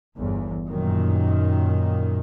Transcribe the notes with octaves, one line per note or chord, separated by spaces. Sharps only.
G1 E2
F#2 A#2 D#3